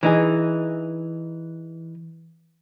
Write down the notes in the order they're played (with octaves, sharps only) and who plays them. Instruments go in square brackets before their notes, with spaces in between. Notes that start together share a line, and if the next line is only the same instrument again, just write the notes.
[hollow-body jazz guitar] E3 D#4 G#4